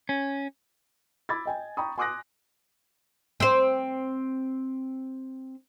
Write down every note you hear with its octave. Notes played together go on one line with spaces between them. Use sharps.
C#4
B5 D6 E6 G#6 A6
D#5 G5 G#5
G5 A#5 B5 C#6 D#6
G#5 C6 D6 D#6 F#6 A#6
C4 C5